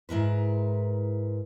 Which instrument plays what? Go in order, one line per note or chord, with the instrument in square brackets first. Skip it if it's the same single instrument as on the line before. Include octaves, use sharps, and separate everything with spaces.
[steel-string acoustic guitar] G#2 E4 A#4 B4